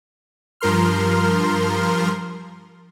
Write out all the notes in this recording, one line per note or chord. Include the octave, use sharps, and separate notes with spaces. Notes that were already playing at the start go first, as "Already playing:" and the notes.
G2 F3 A#4 C6 F6